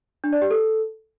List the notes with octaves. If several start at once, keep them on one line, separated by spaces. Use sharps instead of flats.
D4
D5
G4
A4